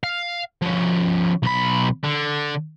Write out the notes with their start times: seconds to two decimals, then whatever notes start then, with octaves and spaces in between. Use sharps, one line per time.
0.04 F5
0.62 F3 C#4
1.43 B1 B5
2.04 D3